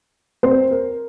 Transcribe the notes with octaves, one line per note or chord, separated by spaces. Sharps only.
C4 C5
A#4